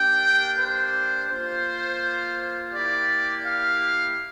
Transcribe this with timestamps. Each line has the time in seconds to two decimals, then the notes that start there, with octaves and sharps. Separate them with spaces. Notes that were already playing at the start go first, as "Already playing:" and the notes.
Already playing: A#3 D4 G4 G5
0.59 C5
1.30 A#3 F4 C5
2.73 A#3 E4 G4 D5
3.44 F5